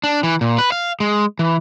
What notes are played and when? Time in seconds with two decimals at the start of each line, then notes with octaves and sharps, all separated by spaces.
0.04 D4
0.23 E3
0.41 A#2
0.59 B4
0.72 F5
1.00 G#3
1.39 E3